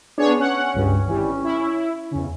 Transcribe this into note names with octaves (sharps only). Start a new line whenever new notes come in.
B3 D4 G#4 C#5
C#4 F#5
C#2 G2
G#1 E3 G3
E4
E2 C#3